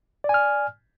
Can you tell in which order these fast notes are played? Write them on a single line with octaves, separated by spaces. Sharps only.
D5 G#5 F6